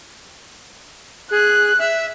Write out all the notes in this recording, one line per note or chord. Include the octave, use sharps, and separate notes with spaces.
G#4 F#6
E5